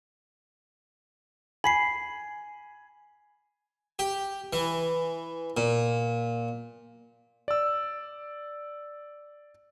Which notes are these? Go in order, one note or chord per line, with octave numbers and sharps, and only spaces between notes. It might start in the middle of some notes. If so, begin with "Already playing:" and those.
G#5 B5 B6 C7
G4
E3
A#2
D5 E6